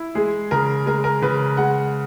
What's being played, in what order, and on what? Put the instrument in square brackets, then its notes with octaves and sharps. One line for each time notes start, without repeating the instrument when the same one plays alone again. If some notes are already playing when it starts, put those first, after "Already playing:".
Already playing: [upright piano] E4
[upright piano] G#3 [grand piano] G#4
[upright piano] C#3 [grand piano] A#4
[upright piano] G#3 [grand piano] A#4
[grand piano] A#4
[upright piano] C#3 [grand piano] B4
[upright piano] G#3 [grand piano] F#5